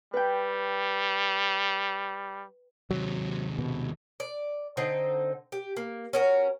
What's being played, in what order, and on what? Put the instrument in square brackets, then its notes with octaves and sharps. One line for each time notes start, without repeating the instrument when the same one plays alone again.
[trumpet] G3 [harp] B4 G5
[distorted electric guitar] D#2 C3 [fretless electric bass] F#3
[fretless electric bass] B2
[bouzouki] D5
D3 C4 D#4
G4
A#3
C#4 F#4 A#4